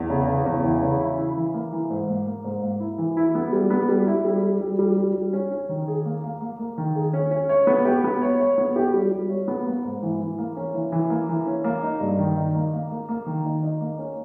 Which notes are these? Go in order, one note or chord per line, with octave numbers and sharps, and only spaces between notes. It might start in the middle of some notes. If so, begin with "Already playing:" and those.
Already playing: E2
C#3
C#3
E2
E3
C#3
E4
E4
E3
A#3
E3
G#2
A#3
A#3
G#2
A#3
E4
E3
E4
B3
G3
B3
G3
E4
G3
G3
G3
G3
G3
G3
C#4
C#4
D#3
G#4
A#3
A#3
A#3
A#3
D#3
G#4
C#4
C#4
C#5
B3
G4
B3
C#5
C#5
B3
G4
G3
G3
C#5
B3
A#3
G#2
E3
E3
A#3
C#4
E3
E3
A#3
E3
C#4
A#3
D#4
G2
D#3
D#4
A#3
A#3
A#3
A#3
D#3
D#4
D#4
A#3
C#4